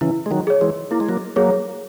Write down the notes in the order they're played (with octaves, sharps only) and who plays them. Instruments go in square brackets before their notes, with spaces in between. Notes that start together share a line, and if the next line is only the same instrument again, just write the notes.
[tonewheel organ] C#3 E3 [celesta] E4
[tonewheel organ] G#3
D#3 F#3
[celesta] G#4 C#5
[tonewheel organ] E3 G#3
[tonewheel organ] A#3 [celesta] E4
[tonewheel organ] G#3
F#3 A#3
[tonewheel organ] F#3 A#3 [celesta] G#4 C#5